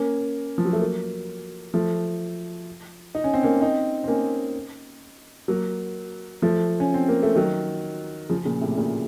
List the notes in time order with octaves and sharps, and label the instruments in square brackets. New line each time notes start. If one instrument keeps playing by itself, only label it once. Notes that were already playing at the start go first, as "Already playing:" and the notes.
Already playing: [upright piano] A#3 C#4
F3
F#3
A3
F#3 A#3
F3 A3
D#4
C#4
C4
A#3 C#4
C4 D#4
C4
A#3 C#4
F#3 A#3
F3 A3
C#4
C4
A#3
A3
D#3 F#3
C#3 F3
A#2 C#3
A2 C3
A#2 C#3